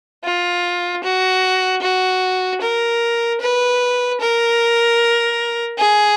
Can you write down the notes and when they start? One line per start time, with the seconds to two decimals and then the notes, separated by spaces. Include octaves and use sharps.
0.24 F4
1.03 F#4
1.82 F#4
2.61 A#4
3.41 B4
4.20 A#4
5.78 G#4